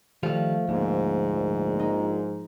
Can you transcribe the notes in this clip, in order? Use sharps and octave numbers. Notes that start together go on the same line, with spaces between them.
D#3 F3 G3 A3 F5 F6
D2 G#2 A#3 B3
A#1
D#4